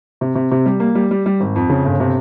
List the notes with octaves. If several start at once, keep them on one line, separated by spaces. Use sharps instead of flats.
C3
C3
C3
G3
A#3
G3
G3
G3
G#1
F2
C#3
G1
C3